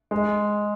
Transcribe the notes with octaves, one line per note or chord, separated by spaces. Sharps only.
G#3